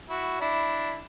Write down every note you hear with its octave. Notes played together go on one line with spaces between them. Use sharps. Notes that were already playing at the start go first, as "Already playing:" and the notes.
E4 F#4
D4 E4